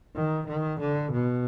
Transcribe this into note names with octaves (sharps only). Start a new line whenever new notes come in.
D#3
D#3
D3
B2